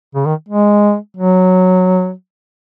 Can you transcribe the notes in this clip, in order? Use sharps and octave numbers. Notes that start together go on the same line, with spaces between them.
C#3
D#3
G#3
F#3